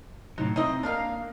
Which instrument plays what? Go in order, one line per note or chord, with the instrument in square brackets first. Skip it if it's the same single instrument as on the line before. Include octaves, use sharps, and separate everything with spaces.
[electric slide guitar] A2 C3 F#3 [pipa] D#4
[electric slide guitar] C4 [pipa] D#4 E4 D#5
[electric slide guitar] A#3 [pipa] D4 A#4 F5